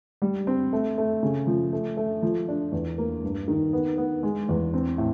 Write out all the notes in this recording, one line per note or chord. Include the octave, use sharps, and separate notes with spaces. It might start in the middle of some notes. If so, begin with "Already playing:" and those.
G3
C4
A3
A3
C#3
F3
A3
A3
F3
D4
E2
A#3
G2
D#3
B3
B3
G#3
E2
C4
A2